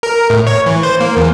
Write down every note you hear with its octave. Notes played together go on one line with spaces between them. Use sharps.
A#4
A2
C#5
E3
C5
A#3
E2